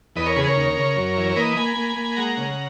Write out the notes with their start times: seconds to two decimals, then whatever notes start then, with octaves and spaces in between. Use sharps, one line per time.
0.16 E2 B4 D#5
0.26 A#4 C#5
0.36 C#3 G#4 B4
0.46 A#4 C#5
0.56 D#2
0.77 C#3
0.96 F#2
1.17 E3
1.30 C#5
1.36 A#3 B4 D#5
1.57 A#3 G#5 B5
1.77 A#3
1.96 A#3
2.16 G#3 F#5 A#5
2.37 C#3